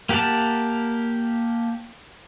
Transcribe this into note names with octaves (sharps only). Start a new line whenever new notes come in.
A#3 G4 A#4 F#5 A5